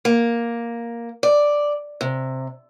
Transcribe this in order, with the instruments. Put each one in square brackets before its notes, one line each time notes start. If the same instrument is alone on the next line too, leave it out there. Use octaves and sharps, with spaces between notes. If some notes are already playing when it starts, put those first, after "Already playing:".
[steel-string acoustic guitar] A#3
D5
C3